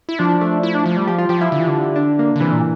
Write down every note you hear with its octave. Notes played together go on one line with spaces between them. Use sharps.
E4
F3 D4
A3
E4
D4
F3
G3
F3 G4
F4
F3 G4
E4
D3
E3
D3
D4
A#3
D3
C3 E3
A#2